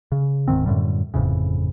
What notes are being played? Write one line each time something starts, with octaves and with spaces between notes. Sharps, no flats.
C#3
D1 G#2 D#3 C4
F#2 A2 D3 G3
G1 F2 A2 C#3